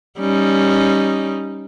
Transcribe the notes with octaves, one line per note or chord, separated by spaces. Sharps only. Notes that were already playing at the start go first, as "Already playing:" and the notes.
G3 C#4 D#4